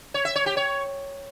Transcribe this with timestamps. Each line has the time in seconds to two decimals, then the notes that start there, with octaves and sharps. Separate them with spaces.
0.14 C#5
0.25 E5
0.35 C#5
0.46 G4
0.57 C#5